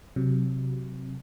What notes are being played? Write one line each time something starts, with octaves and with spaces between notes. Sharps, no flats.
C3 F#3